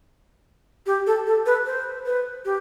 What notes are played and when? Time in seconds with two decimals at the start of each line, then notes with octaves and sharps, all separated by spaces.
0.86 G4
1.07 A4
1.26 A4
1.46 B4
1.66 C5
2.06 B4
2.45 G4